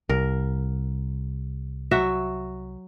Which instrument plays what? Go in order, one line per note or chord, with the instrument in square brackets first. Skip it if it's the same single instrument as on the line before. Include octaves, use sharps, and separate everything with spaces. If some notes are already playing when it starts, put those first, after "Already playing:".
[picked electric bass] C2 [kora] A#4
[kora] F#3 F#4 E5